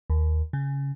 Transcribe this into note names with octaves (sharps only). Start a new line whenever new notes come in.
D#2
C#3